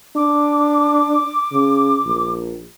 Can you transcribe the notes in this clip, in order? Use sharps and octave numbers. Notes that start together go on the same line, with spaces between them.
D4 D6
C#3
A#1